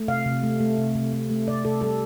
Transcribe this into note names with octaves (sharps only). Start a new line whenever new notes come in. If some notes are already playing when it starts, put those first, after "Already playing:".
Already playing: A3
C3 F5
C3
A3
A3
C3
C3
A3
A3
C3 D5
C3 A4
G3 A4